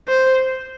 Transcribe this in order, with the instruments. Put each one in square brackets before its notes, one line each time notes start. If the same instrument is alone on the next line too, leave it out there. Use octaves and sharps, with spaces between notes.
[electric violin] C5